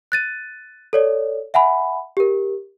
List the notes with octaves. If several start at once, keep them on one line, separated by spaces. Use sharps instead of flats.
F#6 A6 D#7
A4 C#5 D5
E5 F#5 G#5 B5
G4 A#4